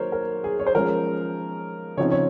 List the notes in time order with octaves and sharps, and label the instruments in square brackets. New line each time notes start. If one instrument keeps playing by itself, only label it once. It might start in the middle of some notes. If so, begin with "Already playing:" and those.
Already playing: [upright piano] D#3 F#3 A#3 D#4 A#4 C5 C#5
A#4
G#4
C#5
C5
F3 G#3 C#4 A#4
C#3 F3 C4 D#4 C#5
C#5